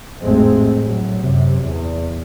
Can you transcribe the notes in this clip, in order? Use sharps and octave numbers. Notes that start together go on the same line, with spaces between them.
A1 F2 G#2 G#3 A3 C4
A2 F#3
F#2 C3
E2